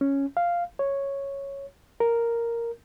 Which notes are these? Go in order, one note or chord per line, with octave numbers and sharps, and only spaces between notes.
C#4
F5
C#5
A#4